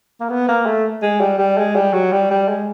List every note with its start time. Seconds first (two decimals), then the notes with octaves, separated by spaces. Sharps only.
0.20 A#3
0.29 B3
0.48 A#3
0.66 A3
1.02 G#3
1.21 G3
1.38 G3
1.58 G#3
1.75 G3
1.93 F#3
2.12 G3
2.30 G3
2.48 G#3